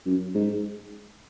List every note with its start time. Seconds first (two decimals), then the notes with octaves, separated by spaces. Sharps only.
0.06 F#2
0.35 G#2